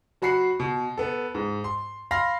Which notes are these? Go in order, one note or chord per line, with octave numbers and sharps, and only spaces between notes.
F#3 F#4 B5 C7 C#7
B2
B3 A4
G#2
C6
F5 B5 C6 A#6